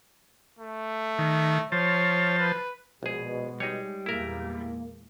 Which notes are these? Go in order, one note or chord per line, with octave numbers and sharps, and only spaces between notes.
A3
D#3
F3 C5 C#5 A5
B4
A#1 B2 G#3 G#4
G3 D#4 G#4 C#5
E2 A#2 G#3 A#3 E4 A#4